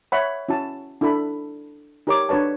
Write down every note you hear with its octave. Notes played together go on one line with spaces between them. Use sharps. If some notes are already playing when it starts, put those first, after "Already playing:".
C#5 E5 F#5 B5
C#4 E4 F#4 A5
D4 E4 A4 F#5 B5
D#4 G4 A#4 C#5 A#5 D6
D4 F#4 B4 C#5 A5